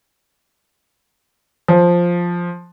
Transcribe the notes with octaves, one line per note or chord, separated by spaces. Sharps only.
F3